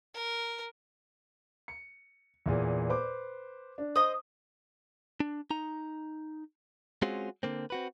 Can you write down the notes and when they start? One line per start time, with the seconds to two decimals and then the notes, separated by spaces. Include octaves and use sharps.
0.14 A#4
1.68 C#7
2.46 E2 A#2 G#4
2.89 B4 C5 D6
3.78 D4
3.96 C5 D#5 D#6
5.20 D4
5.51 D#4 A#5
7.02 G#3 C4 C#4 F4 F#4 G#4
7.43 D3 A#3 C4
7.70 C4 F#4 B4